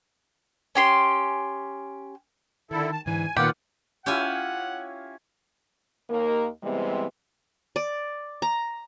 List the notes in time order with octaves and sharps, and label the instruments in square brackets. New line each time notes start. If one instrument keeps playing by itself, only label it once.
[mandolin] C#4 G4 C6
[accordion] D3 E4 A4 [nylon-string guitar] D#3
[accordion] A5
[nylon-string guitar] G#2 D3 E3 [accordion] G#5
[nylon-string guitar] A#2 D#3 A#3 [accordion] B3 F4 F#5 [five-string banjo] G4
[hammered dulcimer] C#4 E4 F4 [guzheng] G4 G#5 [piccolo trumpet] F#5
[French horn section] D#2 A#3 A#4
C3 E3 G3 G#3 B3 C4
[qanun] D5
A#5